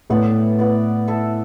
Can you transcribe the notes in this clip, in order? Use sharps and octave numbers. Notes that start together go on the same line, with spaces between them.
A2 A3 B3 E4 B4 D5
B3 E4 B4 D5
E4 A4 E5